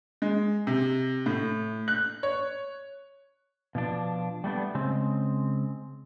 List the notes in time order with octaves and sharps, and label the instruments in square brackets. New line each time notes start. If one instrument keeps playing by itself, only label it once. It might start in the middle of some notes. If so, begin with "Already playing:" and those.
[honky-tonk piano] G#3
C3
A2
F#6
C#5
[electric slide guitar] B2 F3 D4
G3 A3 B3 D4
C#3 G#3 C4